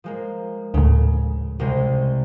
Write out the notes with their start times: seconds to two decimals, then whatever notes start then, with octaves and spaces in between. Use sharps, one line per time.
0.04 F3 G#3 A#3
0.74 D2 A2 C#3
1.59 C2 C3 G#3